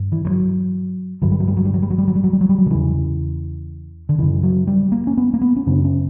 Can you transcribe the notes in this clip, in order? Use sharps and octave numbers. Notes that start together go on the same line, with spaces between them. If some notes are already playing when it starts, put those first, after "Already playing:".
Already playing: G2
E3
E3
F#3
G2 D3 F#3
G3
F#3
G3
F#3
G3
F#3
G3
F#3
G3
F#3
G3
F#3
G3
F#3
G3
F#3
D3
E2 C#3 E3
D3
F#2 C#3 E3
F#3
G3
A#3
C#4
B3
A#3
B3
C#4
F#2 C#3 D4
C#4